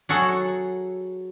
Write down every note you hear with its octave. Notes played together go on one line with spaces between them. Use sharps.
F#3 F#4 G#4 A4 F#5